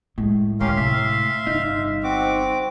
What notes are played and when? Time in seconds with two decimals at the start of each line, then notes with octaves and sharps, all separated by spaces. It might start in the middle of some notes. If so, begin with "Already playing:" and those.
0.18 A2 G#3
0.60 D2 A3 C#4 G4 A#4 F5 C6
0.76 C3 A3 E5
1.47 G1 D#4
2.04 C4 F#4 D6